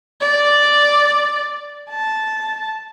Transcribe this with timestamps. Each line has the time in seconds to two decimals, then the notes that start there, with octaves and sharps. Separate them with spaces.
0.21 D5
1.90 A5